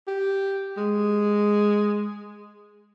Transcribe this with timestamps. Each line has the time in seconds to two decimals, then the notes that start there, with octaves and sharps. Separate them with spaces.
0.07 G4
0.77 G#3